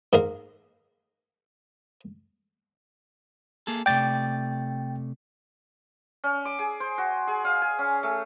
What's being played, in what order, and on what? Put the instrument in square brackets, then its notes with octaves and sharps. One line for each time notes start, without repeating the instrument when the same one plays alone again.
[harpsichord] G#2 A#3 A#4 F5
[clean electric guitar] A#3 G#4 A4
[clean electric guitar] C3 A3 D5 [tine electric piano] G5 A6
[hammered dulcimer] C#4
D6
G#4
C5
F#4
G#4
F5
G#5
C#4
A3